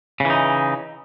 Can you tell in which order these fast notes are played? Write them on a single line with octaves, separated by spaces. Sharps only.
C#3 E3 D#4